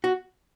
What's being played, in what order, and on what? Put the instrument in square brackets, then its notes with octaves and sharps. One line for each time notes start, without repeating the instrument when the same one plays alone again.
[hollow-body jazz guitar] F#4